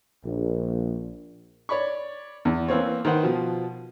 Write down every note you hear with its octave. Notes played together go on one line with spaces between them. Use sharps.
A#1
C#5 D5 B5 C#6
E2
E3 A#3 C4 C#5
D#3 B4 C5 F#5
B2 F3